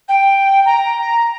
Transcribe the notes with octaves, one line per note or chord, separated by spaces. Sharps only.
G5
A#5